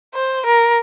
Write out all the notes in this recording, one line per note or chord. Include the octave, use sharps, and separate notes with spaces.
C5
A#4